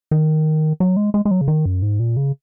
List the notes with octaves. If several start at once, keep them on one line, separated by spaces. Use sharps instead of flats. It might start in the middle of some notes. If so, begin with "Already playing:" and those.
D#3
F#3
G#3
G#3
G#3
F#3
C#3
D#3
F#2
G#2
A#2
C#3